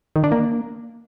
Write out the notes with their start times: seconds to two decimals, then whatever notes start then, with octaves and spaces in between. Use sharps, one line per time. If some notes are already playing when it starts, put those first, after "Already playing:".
0.16 D#3
0.24 D4
0.32 A#3